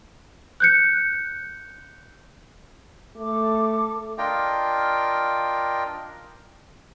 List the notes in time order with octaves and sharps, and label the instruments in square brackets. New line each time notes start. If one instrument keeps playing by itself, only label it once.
[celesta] F#6 G6 C#7
[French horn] A3 [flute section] A4 D6
[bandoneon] D4 F4 A#4 D#5 F5 G5